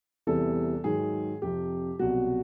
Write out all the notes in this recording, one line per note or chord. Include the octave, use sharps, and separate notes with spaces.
E2 C3 E3 G3 A4
G#2 D#3 F#3 G#4
F2 C3 F3 G4
C2 B2 F#3 F#4